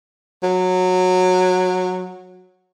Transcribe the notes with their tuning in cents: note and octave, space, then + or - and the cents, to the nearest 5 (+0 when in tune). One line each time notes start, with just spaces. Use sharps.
F#3 -15